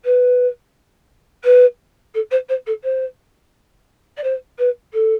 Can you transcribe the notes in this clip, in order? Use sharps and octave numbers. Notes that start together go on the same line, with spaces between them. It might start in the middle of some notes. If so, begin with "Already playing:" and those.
B4
B4
A4
C5
C5
A4
C5
D5
C5
B4
A4